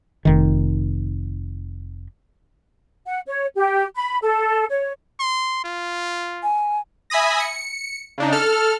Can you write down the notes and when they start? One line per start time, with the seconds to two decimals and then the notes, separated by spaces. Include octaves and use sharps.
0.25 F1 D#3
3.06 F#5
3.26 C#5
3.56 G4
3.95 B5
4.22 A4
4.70 C#5
5.20 C6
5.64 F4
6.43 G#5
7.10 E5 G#5 B5 D#6 A#6
7.40 C#7
8.18 C#3 D4 D#4
8.32 A4 F6